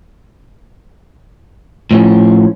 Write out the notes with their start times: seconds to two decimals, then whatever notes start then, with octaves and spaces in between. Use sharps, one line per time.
1.91 A2 F3 C#4